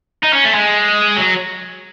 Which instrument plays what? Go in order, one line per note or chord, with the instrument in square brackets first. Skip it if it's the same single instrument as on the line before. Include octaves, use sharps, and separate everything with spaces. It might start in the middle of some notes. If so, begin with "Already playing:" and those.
[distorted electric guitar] D#4
C#4
A3
G#3
F#3